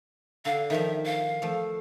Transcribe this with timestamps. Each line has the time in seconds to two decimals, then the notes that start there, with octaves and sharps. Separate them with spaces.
0.45 D3 F5
0.70 D#3 F3 E5
1.06 F5
1.42 F3 A3